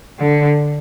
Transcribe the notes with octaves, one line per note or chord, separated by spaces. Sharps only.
D3